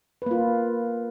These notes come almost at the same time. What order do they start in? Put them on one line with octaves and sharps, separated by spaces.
B4 A#3 F4